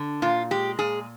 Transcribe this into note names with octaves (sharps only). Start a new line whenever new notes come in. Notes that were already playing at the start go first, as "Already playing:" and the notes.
Already playing: D3
A#2 F4
G#3 G4
A#2 G#4